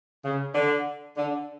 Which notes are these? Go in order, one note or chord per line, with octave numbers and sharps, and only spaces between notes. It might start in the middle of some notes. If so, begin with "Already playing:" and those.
C#3
D3
D3